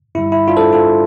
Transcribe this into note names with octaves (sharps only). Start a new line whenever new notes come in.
G2 D3 G3 E4
E4
D4 F4
A4 C5
F4 A4